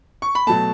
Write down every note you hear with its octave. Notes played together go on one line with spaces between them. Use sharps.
C#6
B5
B2 F#3 A3 A5